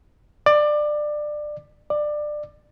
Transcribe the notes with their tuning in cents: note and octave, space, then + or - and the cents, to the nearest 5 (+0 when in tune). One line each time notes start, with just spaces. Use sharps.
D5 +20
D5 +20